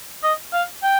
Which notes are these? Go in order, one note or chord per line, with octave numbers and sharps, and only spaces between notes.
D#5
F5
G5